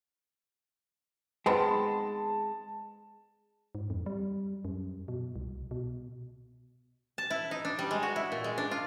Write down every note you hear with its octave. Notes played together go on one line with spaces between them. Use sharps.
D#3 G#3 B3 C4 A5
G#2
F2
G3
F#2
B2
C2
B2
A5
E4
D#4
D4
G3
G#3
F#4
E4
A#2
G#3
D4
F4